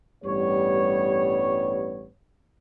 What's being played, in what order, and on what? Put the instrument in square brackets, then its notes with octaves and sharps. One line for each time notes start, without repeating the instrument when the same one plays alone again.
[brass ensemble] A1 G2 G3 B3 G4 C#5